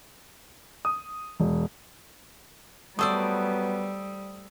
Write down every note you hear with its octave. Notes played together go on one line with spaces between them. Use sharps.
D#6
E1
F#3 G3 A3 B3 C5 D5 D#6 E6